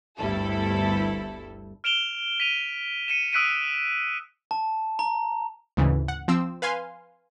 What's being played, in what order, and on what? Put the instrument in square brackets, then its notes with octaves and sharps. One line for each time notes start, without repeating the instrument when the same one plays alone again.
[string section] G1 D2 G2 G3 E4 A4
[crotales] F6 D7 E7 F7 G7
B6 D#7 F7
C#7 D#7 E7
D#6 E6 F#6 B6 D7 D#7
[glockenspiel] A5
A#5
[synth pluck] D2 G#2 C#3 E3
F#5
F3 C4 E6
B4 F5 G#5 C6